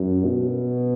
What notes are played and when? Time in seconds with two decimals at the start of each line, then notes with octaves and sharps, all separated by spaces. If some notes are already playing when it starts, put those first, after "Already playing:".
Already playing: F#2
0.26 B2